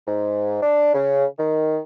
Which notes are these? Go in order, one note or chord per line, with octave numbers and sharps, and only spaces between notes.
G#2
D4
C#3
D#3